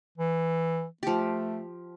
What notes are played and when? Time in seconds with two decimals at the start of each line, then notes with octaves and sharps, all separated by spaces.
0.18 E3
1.03 F3 A3 G4